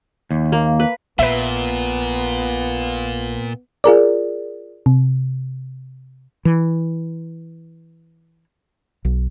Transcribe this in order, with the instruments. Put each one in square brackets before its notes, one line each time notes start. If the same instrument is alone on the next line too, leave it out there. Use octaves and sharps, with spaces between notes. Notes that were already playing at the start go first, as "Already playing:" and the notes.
[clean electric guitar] D#2
[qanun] A#3
B4
[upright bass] A#1 [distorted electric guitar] A#2 [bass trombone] B3 [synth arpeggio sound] B4 E5
[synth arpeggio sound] F4 G#4 A#4 D5
C3
[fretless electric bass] E3
B1